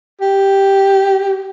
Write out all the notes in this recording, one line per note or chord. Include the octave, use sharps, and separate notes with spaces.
G4